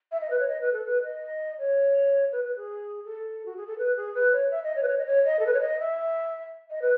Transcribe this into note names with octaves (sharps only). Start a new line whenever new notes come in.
E5
D#5
B4
C#5
D#5
B4
A4
B4
D#5
C#5
B4
B4
G#4
A4
F#4
G#4
A4
B4
G#4
B4
C#5
E5
D#5
C#5
B4
C#5
D#5
C#5
D#5
A4
B4
C#5
D#5
E5
D#5
B4